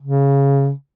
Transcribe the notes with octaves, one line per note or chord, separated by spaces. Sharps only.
C#3